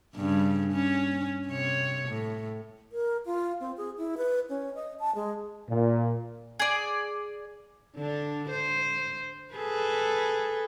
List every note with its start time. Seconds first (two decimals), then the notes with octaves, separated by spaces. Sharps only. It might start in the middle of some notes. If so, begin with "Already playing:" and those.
0.16 G2 C#3
0.72 C#4
1.48 C3 C#5
2.09 A2
2.92 A#4
3.26 F4
3.60 C4
3.77 G#4
3.98 E4
4.17 B4
4.49 C#4
4.75 D#5
5.00 A5
5.15 G#3
5.69 A#2
6.59 G#4 D5
7.96 D3 D4
8.50 C5
9.54 G#4 A4 B4